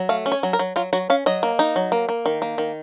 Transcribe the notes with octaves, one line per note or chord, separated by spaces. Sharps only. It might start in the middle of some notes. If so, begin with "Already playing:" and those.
Already playing: F#3
A3 F5
C#4
C#5
F#3
A#4
F#3
F#3 F4
F#3 F#4
C#4 F5
F#3 D#5
A#3
D#4
F#3
A#3
A#3
D#3
A#3
D#3